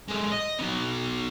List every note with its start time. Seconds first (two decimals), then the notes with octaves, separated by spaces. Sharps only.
0.08 G#3 A3
0.31 D#5
0.59 F#3 B3